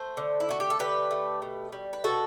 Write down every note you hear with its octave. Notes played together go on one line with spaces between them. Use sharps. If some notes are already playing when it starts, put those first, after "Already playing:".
Already playing: A3 C5
D3
E4
A3 F#4
G4
A4
D3 G4 B4
A3
B2
G3
B4
B2 F#4 A4